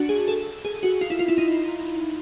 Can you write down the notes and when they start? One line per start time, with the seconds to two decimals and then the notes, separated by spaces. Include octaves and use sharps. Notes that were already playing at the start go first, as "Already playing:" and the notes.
Already playing: D4 F#4
0.09 G#4
0.28 A4
0.65 G#4
0.83 F#4
1.01 F4
1.10 E4
1.19 F4
1.28 E4
1.38 D#4